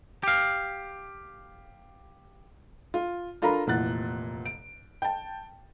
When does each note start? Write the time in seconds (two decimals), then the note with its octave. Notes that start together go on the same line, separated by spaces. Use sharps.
0.23 G4 F5
2.94 F4
3.42 D4 F4 A4 A#4 A#5 B5
3.67 F1 A#2 E3 F#5 F#6 A6
4.46 D7
5.02 G5 A5